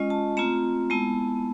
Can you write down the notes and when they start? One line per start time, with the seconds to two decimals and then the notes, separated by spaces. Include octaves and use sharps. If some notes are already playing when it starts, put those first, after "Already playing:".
Already playing: G#3 C#4 F4 D#5
0.10 A5
0.37 A3 C4 F4 A#5
0.90 G#3 B3 E4 A5